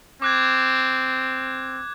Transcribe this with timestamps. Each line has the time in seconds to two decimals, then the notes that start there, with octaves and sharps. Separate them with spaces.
0.22 C4 D6 F#6 G#6